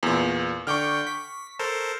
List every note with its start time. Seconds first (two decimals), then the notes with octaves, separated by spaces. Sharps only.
0.03 E2 A#2
0.67 D3 G5 C#6 D6 F6 G6
1.07 B6
1.59 A4 A#4 C5